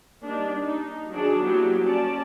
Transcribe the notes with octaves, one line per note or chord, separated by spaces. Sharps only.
G3 A#3 D4 D#4
D#4
D#3 F#3 D4 G#4 D5
F#3 G3 A#3 B3 E4 G4
C#4 D5 A5